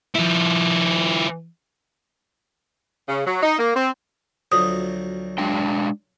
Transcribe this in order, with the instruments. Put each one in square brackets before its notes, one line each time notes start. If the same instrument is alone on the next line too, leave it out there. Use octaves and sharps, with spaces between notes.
[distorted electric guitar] F3 E4
[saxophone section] C#3
F#3
D#4
A#3
C4
[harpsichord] D2 F3 F#3 [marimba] D#6
[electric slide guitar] G#3 D4 G5